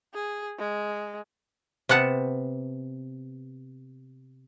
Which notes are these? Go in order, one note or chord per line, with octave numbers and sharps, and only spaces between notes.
G#4
G#3
C3 B3 F#5 A5